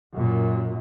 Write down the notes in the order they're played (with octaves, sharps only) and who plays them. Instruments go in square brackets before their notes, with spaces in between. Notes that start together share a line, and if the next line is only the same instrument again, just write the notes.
[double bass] F#2 A#2